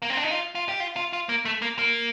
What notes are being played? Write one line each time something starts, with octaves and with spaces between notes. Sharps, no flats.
A#3
C4
D4
D#4
F4
F4
G4
F4
F4
F4
A#3
A3
A#3
A#3